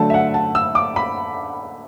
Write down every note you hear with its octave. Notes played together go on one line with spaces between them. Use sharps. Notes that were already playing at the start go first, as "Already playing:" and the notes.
Already playing: D3 F#3 A3 A5
E5
F#5
A5
E6
D6
B5